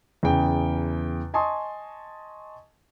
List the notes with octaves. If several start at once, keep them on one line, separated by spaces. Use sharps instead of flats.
E2 C#3 G5
D#5 G#5 A5 C6 C#6 D#6